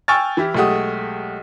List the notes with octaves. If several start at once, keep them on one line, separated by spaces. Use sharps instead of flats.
G5 G#5 C#6 E6 F6 A6
E3 E4 G4
B1 G#3 A3 G4 F#5 D#6